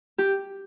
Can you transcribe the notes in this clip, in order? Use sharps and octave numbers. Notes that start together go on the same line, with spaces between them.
G4